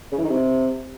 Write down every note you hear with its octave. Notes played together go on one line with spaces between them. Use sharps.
C#3
E3
D#3
C3